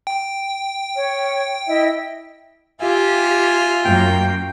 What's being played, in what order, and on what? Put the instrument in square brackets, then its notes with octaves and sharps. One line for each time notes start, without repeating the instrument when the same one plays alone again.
[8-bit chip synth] G5
[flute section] C#5
E4 D#5 E5
[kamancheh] F4 [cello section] G4 [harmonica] E5 G#5
[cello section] F#2 A#3 [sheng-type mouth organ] G5